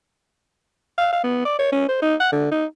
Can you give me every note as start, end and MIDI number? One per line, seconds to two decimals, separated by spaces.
0.98 1.09 77
1.13 1.20 77
1.24 1.40 59
1.45 1.57 74
1.59 1.72 73
1.72 1.87 61
1.89 1.97 72
2.02 2.15 63
2.20 2.28 78
2.32 2.47 50
2.52 2.65 63